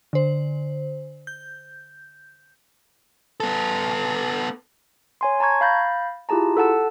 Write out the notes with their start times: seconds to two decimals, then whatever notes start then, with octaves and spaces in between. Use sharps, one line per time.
0.13 D3 C5
1.27 G6
3.40 B3 A4
5.21 C#5 G#5 C6
5.40 A5 A#5 C#6 G#6
5.61 F5 B5 G6 A6 A#6
6.29 E4 F4 G4 G#4 A5 A#5
6.57 A4 F#5 A5 E6